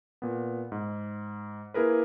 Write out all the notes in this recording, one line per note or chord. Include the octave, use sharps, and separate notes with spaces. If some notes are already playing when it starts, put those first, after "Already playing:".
A#2 B3
G#2
A#3 E4 G#4 A#4 B4